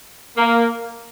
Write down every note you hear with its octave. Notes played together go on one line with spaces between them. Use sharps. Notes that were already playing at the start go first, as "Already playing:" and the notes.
A#3